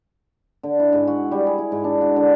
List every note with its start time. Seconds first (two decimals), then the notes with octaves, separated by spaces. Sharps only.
0.63 D3
0.80 E4
0.93 G#2
1.07 F#4
1.31 G3
1.47 G#4
1.58 E4
1.72 G#2
1.84 D4
2.01 F#4
2.16 D3